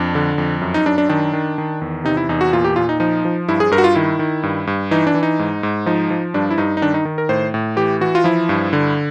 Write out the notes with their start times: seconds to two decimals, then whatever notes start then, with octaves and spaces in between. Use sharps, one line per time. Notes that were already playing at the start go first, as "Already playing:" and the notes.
Already playing: F2 D4
0.15 D3
0.38 F2
0.61 F#2
0.74 D#4
0.86 F#2 D4
0.98 D4
1.09 D#3 D4
1.33 D#3
1.58 D#3
1.82 E2
2.04 C3 D#4
2.17 E4
2.29 E2 D#4
2.41 F#4
2.53 A#2 F4
2.64 G4
2.76 A#2 F4
2.89 D#4
3.00 F3 D#4
3.25 F3
3.49 G2 E4
3.60 G#4
3.71 G2 A#4
3.78 F#4
3.84 F4
3.95 D#3 E4
4.19 D#3
4.43 G2
4.67 G2
4.91 E3 D#4
5.07 D4
5.14 E3
5.23 D#4
5.39 G#2
5.63 G#2
5.86 F3 D#4
6.10 F3
6.34 G2 D4
6.51 E4
6.58 G2 D#4
6.77 D#4
6.82 D#3 D4
6.94 D#4
7.05 D#3
7.18 A#4
7.29 A2 C5
7.54 A2
7.76 E3 G4
8.01 E3 F#4
8.15 F4
8.24 F3 E4
8.49 G2
8.73 D3